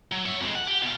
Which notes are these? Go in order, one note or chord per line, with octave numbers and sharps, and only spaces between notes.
F#3
C#5 E5
F2 G#3
F#5
G4
B2 F5